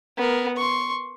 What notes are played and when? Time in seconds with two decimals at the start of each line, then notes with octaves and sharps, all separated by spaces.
0.17 B3 A#4
0.57 C6 C#6